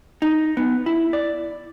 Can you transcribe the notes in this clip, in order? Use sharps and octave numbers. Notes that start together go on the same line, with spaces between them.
D#4
B3
E4
D5